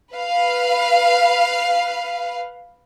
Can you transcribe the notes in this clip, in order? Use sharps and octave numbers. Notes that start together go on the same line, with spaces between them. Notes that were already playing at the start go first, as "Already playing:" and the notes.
B4 F5